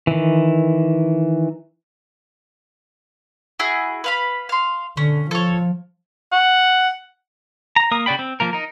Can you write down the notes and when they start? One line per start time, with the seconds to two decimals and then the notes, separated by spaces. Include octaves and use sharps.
0.07 D#3 E3
3.59 E4 F#4 G#4
4.04 B4 F5 B5
4.49 F5 C6
4.97 D3 C#4
5.31 F3 A4 C#5
6.32 F#5
7.76 A#5
7.91 A#3 A#4 D#6
8.06 C#3 F#4 D5 G5 B5
8.19 C4
8.40 F3 A#3 A#4
8.53 D#4 A#4